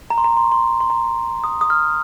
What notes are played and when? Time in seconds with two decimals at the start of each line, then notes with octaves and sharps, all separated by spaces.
0.10 A#5
0.18 C6
0.24 A#5
0.37 C6
0.44 C#6
0.52 C6
0.81 C6
0.90 A#5
1.44 D#6
1.61 D#6
1.70 F6